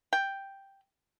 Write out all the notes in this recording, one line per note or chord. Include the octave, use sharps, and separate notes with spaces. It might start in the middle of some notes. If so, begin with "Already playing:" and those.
G5